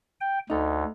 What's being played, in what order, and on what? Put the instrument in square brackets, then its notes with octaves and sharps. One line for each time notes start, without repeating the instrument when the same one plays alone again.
[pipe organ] G5
[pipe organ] D2 [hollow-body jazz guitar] D#4 A4